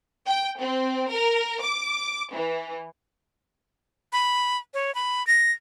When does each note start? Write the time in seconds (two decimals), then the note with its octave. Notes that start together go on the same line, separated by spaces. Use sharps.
0.26 G5
0.61 C4
1.10 A#4
1.62 D6
2.33 E3
4.13 B5
4.74 C#5
4.95 B5
5.27 A#6